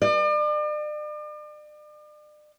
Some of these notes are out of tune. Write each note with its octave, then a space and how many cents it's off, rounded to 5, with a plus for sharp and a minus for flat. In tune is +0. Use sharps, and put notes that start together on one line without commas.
D5 +40